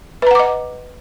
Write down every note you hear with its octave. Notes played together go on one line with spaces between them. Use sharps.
B4 D#5 F#5 A#5 D6